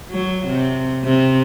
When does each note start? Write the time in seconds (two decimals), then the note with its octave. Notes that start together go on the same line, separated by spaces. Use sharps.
0.11 F#3
0.48 C3
1.05 C3